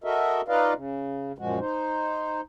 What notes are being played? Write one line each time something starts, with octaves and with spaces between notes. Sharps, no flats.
F#4 A4 A#4 D#5 E5
D#4 F4 B4 D5 D#5 F5
C#3
F#2 A#2 F3 G#3 F#4
D#4 C5